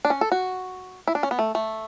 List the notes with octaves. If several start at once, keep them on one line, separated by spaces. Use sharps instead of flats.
D4
C#4
A4
F#4
E4
D4
C#4
B3
A3
A3